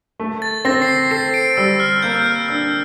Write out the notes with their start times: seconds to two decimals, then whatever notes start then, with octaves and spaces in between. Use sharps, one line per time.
0.20 A3
0.42 A6
0.65 C4 A#6
0.82 C7
0.88 A#6
1.11 A4 C7
1.34 D7
1.57 G3 E6
1.80 F6
2.02 A#3 G6
2.15 E6
2.26 F6
2.49 D4 E6